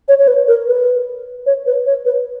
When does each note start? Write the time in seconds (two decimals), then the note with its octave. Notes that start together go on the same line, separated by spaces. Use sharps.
0.08 C#5
0.19 C#5
0.28 B4
0.48 A#4
0.67 B4
1.46 C#5
1.66 B4
1.86 C#5
2.05 B4